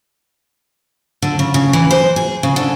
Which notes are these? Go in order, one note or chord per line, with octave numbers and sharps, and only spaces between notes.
D3
C#3
C#3
E3
C5
G#4
C#3
D3